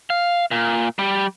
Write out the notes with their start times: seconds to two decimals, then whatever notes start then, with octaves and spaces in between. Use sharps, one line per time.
0.10 F5
0.51 A#2
0.99 G3